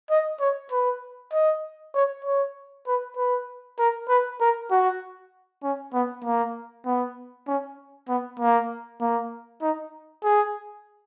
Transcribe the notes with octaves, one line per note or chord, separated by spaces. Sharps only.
D#5
C#5
B4
D#5
C#5
C#5
B4
B4
A#4
B4
A#4
F#4
C#4
B3
A#3
B3
C#4
B3
A#3
A#3
D#4
G#4